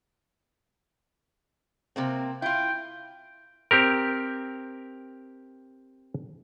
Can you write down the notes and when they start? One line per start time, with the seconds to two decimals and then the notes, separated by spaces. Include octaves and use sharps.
1.96 C3 A#3 C4
2.42 E4 F4 G5
3.71 C4 G4 A#4